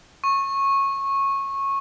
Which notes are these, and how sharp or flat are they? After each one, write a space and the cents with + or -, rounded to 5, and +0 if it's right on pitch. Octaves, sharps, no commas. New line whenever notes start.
C#6 -15